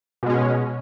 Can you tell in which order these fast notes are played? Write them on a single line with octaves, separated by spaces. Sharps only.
B2 G#3 C#4